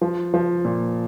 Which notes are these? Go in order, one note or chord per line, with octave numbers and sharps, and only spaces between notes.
F3
F3
A#2